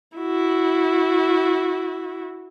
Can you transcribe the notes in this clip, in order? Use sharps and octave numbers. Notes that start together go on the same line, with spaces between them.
E4 F#4